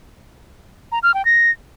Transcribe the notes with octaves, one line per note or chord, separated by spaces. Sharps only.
A#5
F6
G5
A#6